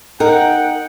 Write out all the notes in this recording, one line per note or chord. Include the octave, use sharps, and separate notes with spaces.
D#4 A#4 F#5 G5